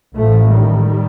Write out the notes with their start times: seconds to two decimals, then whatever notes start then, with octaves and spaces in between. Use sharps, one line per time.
0.15 A1 A2 F3 A3
0.53 D#3 G3